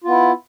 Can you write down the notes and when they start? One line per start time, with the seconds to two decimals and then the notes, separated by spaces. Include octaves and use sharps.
0.04 F4
0.07 B3
0.11 E4